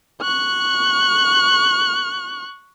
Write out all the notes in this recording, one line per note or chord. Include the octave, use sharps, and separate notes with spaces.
C#6 F#6